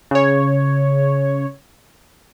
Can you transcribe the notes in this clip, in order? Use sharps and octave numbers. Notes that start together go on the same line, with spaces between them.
C#3 C#5